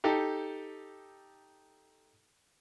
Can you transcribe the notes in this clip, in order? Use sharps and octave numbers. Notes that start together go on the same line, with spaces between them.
D#4 G4 A4